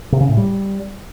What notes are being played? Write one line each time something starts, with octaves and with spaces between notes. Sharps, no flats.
C3
C#3
A2
G3